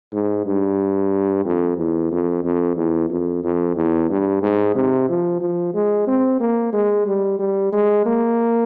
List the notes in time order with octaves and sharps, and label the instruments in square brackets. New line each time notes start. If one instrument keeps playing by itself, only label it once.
[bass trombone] G#2
G2
F2
E2
F2
F2
E2
F2
F2
E2
G2
G#2
C3
F3
F3
G#3
C4
A#3
G#3
G3
G3
G#3
A#3